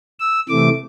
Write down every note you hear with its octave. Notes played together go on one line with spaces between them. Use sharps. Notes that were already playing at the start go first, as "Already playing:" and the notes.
E6
C3 E3 A3 D6